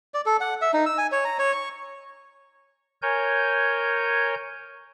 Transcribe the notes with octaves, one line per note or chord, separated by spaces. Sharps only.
D5
A4
F#5
E5
D#4
E6
G#5
C#5
A#5
C#5
C#6
A#4 C#5 G#5 G6